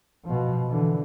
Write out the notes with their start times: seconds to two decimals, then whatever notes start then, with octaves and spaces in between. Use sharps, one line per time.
0.25 B2 F3
0.68 D3 E3